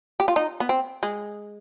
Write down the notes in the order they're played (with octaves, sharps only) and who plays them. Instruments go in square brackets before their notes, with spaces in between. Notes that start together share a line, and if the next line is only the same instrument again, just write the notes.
[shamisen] G4
F4
D#4
B3
C4
G#3